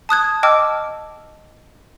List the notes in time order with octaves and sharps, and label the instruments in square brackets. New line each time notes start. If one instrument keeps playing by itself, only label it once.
[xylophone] A5 D#6 F#6 G#6
D#5 G5 A5 D6 E6 F6